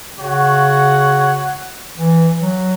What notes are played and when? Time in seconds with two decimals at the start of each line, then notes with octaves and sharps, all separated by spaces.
0.18 C#3 F#4 C#5 F#5
1.97 E3
2.42 F#3